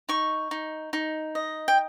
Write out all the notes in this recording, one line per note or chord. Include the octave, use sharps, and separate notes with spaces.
D#4 C#6
D#4
D#4
D#5
G5